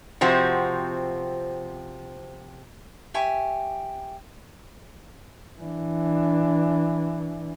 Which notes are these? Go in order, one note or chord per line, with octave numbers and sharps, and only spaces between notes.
C3 F3 C4 F#4
G4 E5 G#5 C#6
E3 D4